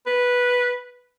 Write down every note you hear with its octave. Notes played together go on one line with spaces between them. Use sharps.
B4